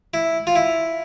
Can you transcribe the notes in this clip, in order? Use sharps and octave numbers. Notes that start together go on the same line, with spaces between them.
E4
F4
E4